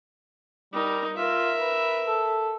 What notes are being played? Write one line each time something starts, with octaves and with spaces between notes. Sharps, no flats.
G3 D#4 A#4
F4 A#4 E5
B4
A4